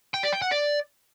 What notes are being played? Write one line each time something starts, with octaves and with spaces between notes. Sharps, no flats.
G5
D5
G5
F#5
D5